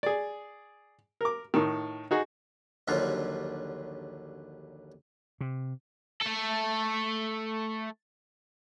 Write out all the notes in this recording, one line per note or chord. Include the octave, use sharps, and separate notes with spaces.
G#4 D5
A#4 D6
A2 D#3
D#4 F#4 G#4
A#1 D#2 D3 F#3 G3 F4
C3
A3 A4